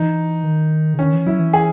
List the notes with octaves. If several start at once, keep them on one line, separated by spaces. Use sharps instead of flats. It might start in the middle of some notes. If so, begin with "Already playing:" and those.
Already playing: E3 D#4
D#3
C#3
D#3 C#4
E3
F#3 E4
E3
G#4